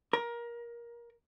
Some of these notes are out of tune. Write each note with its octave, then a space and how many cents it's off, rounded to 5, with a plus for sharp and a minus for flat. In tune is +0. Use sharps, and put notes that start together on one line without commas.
A#4 +20